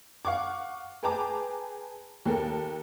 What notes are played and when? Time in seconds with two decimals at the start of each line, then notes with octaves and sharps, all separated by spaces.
0.25 F5 F#5 C#6 D6
1.03 G#4 B4 G5 A5 A#5 D6
2.26 D#2 A4 A#4